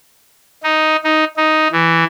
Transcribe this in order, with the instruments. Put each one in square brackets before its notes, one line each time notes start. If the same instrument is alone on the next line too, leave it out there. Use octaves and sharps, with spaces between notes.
[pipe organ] D#4
D#4
D#4
E3